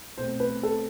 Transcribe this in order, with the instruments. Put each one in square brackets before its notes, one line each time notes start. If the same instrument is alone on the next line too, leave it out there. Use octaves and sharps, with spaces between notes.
[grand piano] B2 A3 C4 C5
B4
A4